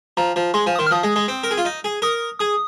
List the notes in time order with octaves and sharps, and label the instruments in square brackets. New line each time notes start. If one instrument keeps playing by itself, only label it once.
[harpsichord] F3 [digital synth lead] A#5
[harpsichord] F3
[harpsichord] G#3 [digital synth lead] C6
[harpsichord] F3 [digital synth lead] G#5
[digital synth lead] D#6
[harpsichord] D#3 [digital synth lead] C6
[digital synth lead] F6
[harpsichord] F3 [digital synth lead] D#6
[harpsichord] G#3
G#3
C4
A#4
G#4
F4
D#4
G#4
[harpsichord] A#4 [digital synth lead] D#6
[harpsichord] G#4 [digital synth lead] D#6